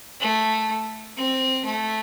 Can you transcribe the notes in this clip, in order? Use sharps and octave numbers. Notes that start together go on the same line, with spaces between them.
A3
C4
A3